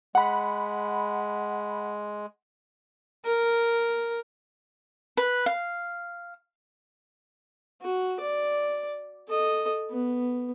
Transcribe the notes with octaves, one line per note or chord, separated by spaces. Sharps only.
G#3 F#5 B5
A#4
B4
F5
F#4
D5
A4 D#5
B3